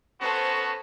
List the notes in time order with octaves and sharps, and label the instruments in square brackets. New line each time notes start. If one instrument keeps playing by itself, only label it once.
[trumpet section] B3 C#4 F#4 [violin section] A4 C5